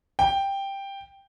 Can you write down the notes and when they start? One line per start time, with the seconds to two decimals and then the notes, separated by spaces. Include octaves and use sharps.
0.19 G5